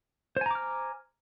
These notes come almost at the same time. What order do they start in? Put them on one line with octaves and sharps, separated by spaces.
C5 G#5 A#5 D6 F6